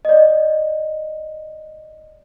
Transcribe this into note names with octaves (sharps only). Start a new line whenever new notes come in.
D5 D#5